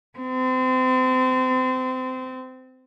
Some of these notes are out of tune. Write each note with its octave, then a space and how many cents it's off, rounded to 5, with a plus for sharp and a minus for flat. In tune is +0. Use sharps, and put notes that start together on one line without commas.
C4 -30